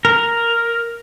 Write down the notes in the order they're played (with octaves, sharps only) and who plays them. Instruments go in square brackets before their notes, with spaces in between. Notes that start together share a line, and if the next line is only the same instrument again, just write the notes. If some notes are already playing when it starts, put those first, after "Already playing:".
[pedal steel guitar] A#4